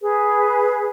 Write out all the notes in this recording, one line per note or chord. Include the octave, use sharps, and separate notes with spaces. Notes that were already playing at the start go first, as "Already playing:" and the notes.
G#4 B4